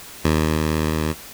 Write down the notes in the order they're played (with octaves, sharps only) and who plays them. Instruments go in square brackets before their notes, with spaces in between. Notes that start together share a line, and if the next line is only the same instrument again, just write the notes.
[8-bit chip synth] D#2